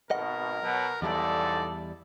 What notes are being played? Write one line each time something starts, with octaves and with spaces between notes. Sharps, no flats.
G#1 B2 A#4 D#5 F#5
B2 F#3
B1 E2 G#2 G3 E4 A4 D5